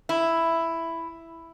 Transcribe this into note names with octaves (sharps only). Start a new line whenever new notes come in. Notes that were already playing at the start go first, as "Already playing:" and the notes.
E4